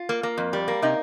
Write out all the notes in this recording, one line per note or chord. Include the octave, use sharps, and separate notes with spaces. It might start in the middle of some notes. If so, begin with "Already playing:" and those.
Already playing: F4
A#3
A#3
F2
G3
A#3
C3 D#4